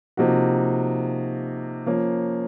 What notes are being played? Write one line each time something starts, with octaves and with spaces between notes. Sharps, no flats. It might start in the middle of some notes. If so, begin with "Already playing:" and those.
C3 F3 A#3 D#4 F#4
F3 A#3 C#4